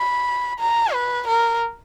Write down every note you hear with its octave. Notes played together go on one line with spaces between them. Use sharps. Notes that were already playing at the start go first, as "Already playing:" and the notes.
Already playing: B5
A#5
B4
A#4